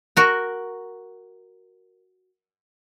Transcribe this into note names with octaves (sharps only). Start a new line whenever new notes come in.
F#4 A#4